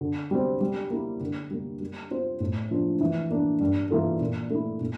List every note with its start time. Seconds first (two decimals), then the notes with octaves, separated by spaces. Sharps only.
0.01 D3
0.31 G3 C4
0.61 G3
0.91 A#3 E4
1.21 D3
1.50 G3 A#3
1.81 G3
2.11 C4 F4 C5
2.40 A2
2.71 F3 A#3 D4 F4
3.01 E3
3.31 A#3 D4
3.60 G2
3.90 E3 A#3 F4 A4
4.21 A#2
4.50 A3 E4
4.81 A#2